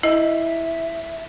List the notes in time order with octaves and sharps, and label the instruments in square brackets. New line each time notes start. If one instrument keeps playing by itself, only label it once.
[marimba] E4 [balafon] D#5 [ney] E5